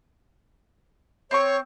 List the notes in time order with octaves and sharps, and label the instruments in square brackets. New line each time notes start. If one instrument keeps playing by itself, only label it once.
[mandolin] C4 B5 C#6 [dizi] C#5